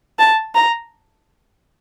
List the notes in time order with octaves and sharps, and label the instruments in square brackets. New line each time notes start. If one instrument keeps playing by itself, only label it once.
[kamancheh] A5
A#5